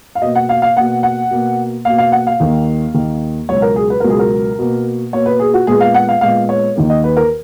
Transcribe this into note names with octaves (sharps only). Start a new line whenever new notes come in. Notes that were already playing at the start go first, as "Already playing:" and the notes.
F5
B2 A#3 D#5
F#5
F5
F5
B2 A#3 F#5
F#5
B2 A#3
B2 A#3 F5
F5
F#5
F5
D#2 D#3 A#3
D#2 D#3 A#3
C#2 B2 F#3 C#5
A#4
G#4
B4
C#2 B2 F#3 A#4
G#4
A#4
B2 A#3
B2 A#3 C#5
B4
G#4
F#4
A#2 G#3 B3 G#4
F5
F#5
F5
A#2 G#3 B3 F5
C#5
D#2 D#3 A#3
D#5
B4
A#4